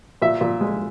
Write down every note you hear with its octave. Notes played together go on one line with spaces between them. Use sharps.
A#2 E5
A#2
G#3